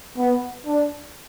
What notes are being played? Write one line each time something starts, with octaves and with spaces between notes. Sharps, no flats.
B3
D4